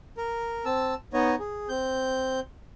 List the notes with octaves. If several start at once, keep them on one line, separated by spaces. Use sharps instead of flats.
A#4
C4 A5 E6
B3 D#4 C#5 D#5
G#4
C4 G6